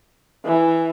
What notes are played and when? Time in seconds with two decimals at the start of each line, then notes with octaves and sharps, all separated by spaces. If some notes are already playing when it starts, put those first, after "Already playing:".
0.46 E3